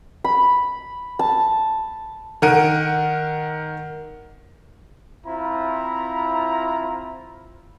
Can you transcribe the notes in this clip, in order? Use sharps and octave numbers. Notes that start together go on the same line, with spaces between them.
B5
A5
D#3 A#4 F#5 D7 D#7
C4 E4 F4 A#5 B5